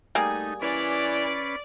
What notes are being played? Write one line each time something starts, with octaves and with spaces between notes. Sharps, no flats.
G3 A3 A#3 D#4 G#4
E3 C#4 B4 D5